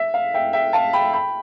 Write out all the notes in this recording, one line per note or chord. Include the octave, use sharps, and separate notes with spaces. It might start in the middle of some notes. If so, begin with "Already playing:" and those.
Already playing: E5
F5
E5 G5
E5 G5
F5 A5
G5 B5
G5 B5